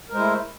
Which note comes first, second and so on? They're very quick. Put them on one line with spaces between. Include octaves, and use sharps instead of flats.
A#4 G#3 C5 E4 A3